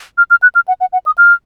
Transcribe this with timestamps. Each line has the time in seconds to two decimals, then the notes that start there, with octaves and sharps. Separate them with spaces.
0.18 F6
0.30 F6
0.42 F#6
0.55 F6
0.68 F#5
0.81 F#5
0.93 F#5
1.06 D#6
1.18 F6